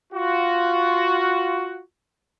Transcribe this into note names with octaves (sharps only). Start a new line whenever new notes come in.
F4 F#4